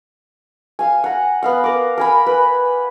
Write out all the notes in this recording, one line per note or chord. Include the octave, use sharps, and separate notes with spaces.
F5 G#5
F#5 A#5
B3 F5 F#5
A#4 D6
A#4 G#5 B5
B4